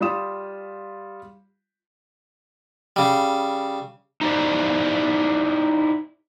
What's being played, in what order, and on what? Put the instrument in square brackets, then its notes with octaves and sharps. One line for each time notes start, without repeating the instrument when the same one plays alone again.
[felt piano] G3 F4 D#6 E7
[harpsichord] C#3 G3
[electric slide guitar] D#4 E4 G4 C5 D5